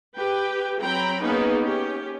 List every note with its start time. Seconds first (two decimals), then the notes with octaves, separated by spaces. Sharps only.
0.16 G4 B4 G5
0.80 F#3 C4 G5 A#5 B5
1.22 A#3 B3 C#4 D#4 G#4 B4
1.59 C#4 G4